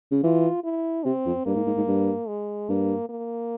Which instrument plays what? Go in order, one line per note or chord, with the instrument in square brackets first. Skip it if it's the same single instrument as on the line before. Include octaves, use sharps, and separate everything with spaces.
[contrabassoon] C#3
[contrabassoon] E3 [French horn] F4
[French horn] E4
[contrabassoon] C3 [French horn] C4
[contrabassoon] F2
[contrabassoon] G2 [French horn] A#3
[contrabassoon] G#2
G#2
G#2
G2
[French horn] G#3
[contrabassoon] G2 [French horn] A#3
[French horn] A#3